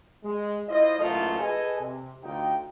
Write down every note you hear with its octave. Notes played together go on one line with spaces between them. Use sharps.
G#3
E4 F4 C5 D#5
F#1 G#2 E3 A3 A#3 F4
G#4 A4 B4 D#5 G#5
C3
D2 D#4 F4 G5